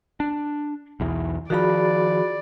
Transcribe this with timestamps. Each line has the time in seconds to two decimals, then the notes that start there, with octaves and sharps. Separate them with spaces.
0.20 D4
1.00 B1 E2 E3
1.50 D#3 F3 F#4 G#4 D5 B5